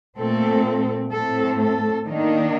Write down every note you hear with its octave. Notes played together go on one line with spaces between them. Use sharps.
A#2 A3 C4 A4
A2 A3 C4 A4
A4
D#3 A#3 D4 D#4